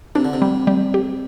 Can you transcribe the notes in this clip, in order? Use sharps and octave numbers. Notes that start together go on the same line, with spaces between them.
C3 D4
D3
C3
G3
G3
G4